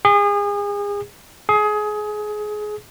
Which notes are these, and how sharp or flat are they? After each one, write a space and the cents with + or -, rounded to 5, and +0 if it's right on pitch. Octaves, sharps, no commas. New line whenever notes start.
G#4 -35
G#4 +20